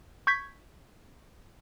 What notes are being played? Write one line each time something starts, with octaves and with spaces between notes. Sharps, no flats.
C#6 G6 G#6 B6